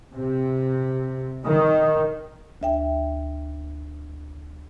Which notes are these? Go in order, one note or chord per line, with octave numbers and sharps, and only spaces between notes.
C3
D#3
D2 E5 G5